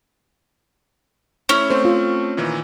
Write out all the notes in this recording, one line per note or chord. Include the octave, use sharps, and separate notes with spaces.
A3 C#4 E4
A3 C4 C5
F4
A#2 D#3 E3